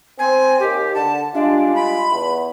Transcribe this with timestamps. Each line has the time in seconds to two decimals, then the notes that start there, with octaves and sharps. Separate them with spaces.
0.19 C4 G#5
0.60 D#2 D#3 G4
0.95 D3 A5
1.34 G3 G#3 D4 F4
1.75 B5
2.11 E2